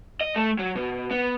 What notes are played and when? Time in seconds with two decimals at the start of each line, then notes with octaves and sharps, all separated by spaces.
0.21 D#5
0.36 A3
0.59 F#3
0.75 B2
1.11 B3